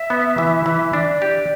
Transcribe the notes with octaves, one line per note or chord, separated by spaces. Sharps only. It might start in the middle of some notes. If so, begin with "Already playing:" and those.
Already playing: E5
B3
E3
E3
D4 D5
G4